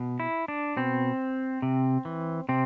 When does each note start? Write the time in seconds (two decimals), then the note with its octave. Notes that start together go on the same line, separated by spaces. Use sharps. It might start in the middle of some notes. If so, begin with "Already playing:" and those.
Already playing: B2
0.20 E4
0.48 D4
0.77 B2 C4
1.62 C3
2.05 E3
2.49 C3 C4